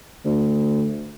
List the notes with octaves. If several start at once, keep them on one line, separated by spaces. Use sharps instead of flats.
D2